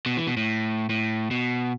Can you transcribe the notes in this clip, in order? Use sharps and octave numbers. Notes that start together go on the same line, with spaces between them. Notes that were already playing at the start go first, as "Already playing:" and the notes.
B2
E3
B2
A2
A2
B2